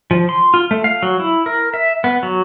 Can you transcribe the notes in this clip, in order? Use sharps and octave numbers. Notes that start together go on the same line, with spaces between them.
F3
C6
F4
A3
F5
F#3
E4
A#4
E5
B3
F#3